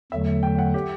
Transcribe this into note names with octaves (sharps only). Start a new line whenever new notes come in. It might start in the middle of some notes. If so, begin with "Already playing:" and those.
E2 D3 F#3 A3 E5
G5
F#5
G4